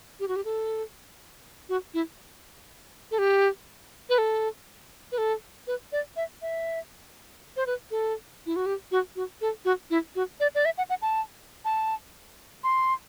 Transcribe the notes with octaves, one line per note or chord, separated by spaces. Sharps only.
G4
F#4
G4
A4
F#4
E4
A4
G4
B4
A4
B4
A4
B4
D5
E5
E5
C5
B4
A4
E4
F#4
G4
F#4
F#4
A4
F#4
E4
F#4
D5
D5
E5
F#5
F#5
A5
A5
C6